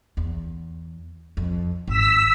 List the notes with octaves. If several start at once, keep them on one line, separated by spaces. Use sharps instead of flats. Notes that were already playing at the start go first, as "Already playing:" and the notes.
E2
F2
G#1 E6 B6